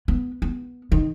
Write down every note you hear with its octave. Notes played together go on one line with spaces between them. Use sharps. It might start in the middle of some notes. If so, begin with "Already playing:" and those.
B3
B3
D#3